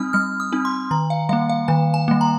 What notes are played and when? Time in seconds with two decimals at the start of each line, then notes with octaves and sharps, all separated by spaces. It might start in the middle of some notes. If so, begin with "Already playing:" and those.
Already playing: G3 C4 D#4 D#6 F6
0.13 G3 F6
0.40 D#6
0.52 C4 D#4
0.65 C6
0.91 D#3 A#5
1.10 F5
1.29 G3 A#3 F5
1.49 F5
1.68 D#3 G#5
1.94 G#5
2.08 G3 A#3
2.21 A#5